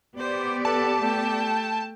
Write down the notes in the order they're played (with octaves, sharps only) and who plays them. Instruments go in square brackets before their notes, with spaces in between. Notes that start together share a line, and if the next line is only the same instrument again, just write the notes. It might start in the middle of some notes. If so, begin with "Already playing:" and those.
[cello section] B3 G4 D5 [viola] C5
[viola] A4 B4 [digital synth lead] A5
[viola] A3 G5